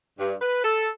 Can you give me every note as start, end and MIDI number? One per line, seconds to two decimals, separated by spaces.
0.18 0.33 43
0.41 0.62 71
0.63 0.88 69